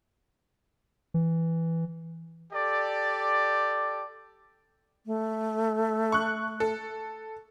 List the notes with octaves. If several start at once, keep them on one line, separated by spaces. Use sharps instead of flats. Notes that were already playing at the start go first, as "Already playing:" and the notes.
E3
G4 A4 D5
A3
C#6 F#6
A4